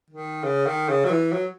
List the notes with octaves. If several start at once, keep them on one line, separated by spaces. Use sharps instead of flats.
D#3
C#3
D#3
C#3
F#3
E3
F#3